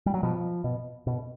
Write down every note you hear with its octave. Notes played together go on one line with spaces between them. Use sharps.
G3
F#3
B2 F3
B2
B2